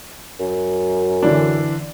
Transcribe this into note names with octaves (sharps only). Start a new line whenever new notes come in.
F#2
D3 E3 D4